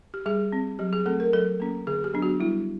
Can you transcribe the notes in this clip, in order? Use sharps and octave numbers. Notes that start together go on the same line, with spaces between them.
G4
G3 G#4
C4
F#3 G4
G#4
A3 C4 A4
A#4
F#3 A4
A#3 C#4
D3 G#4
G4
F#3 B3 D4
F#4
G3 E4